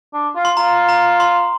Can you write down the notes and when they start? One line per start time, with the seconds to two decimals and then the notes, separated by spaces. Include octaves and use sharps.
0.13 D4
0.36 F4
0.45 C6
0.57 F4 A#5
0.89 A#5
1.20 C6